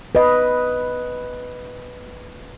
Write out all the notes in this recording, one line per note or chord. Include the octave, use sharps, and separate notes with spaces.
B4 D#5